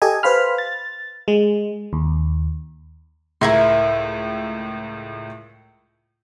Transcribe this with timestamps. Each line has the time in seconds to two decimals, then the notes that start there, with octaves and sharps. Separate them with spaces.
0.02 G4 A4 D#5 G#5
0.23 B4 C5 F5 B5 F6
0.58 A6
1.28 G#3
1.93 D#2
3.41 C#2 A2 E4 A#4 E5 C6